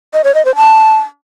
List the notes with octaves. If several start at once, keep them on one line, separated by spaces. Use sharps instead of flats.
D#5
C#5
D#5
C5
A5